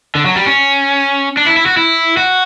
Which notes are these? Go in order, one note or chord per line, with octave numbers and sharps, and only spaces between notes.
D3
F#3
G3
C#4
D4
E4
E4
F#4
E4
F#4